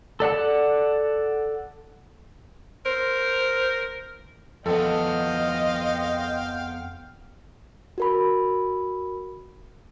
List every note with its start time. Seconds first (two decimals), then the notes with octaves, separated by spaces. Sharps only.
0.20 A4 D5 F#5 A5
2.86 A#4 C5
4.66 F2 B3 A4 C5 D#5 F5 G5
7.98 F#4 A#4 B5